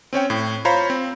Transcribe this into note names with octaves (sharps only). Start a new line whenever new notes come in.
C4 C#4 C#5 G5
A2
F4 C5 C#5 F5 A#5 B5
C4